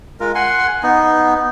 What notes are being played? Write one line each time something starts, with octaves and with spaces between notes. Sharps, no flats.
G#3 F4 A#4
F#5 G#5 C6
B3 D#4